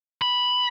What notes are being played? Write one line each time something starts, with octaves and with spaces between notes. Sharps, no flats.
B5